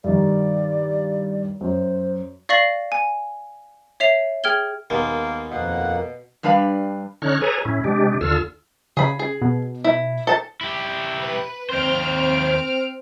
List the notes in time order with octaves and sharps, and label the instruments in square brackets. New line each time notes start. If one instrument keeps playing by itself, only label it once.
[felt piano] G2 D#3 [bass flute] D5
[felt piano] F#2 [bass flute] C5
[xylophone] D5 F5 C#6 A#6 C7 F#7
G#5
C#5 E5 C7 F7
G#4 G5 F6 G#6 G7
[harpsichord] D#2 G#3 B3 [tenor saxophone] A#3
[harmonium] F2 A#3 F#5 [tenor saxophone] B2
[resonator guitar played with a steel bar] G2 G3 D4 B4 F5
[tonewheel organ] D3 C#4 D#4 C#5 F6 F#6
G#4 A4 B4 C#5 G#5 A#5
A2 C#4 E4
C3 G#3 D4 G4
D#2 D3 F4 A4 E6 F6
[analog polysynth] C#3 [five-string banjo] G#4 B5
[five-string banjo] G#4
[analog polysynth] B2
[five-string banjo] E4
A4 A5
[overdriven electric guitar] E4 G4
[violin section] B4
[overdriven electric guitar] D#2 C5 [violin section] C4 F6 D7